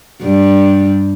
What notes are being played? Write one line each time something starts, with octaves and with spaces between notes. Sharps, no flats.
G2 G3